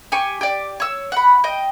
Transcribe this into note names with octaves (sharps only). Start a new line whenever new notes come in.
G4 G#5 C#6
G4 D5
C#5 E6
F#5 B5
D#5 G5